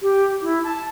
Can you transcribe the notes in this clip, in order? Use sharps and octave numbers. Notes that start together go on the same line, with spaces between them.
G4
E4
A5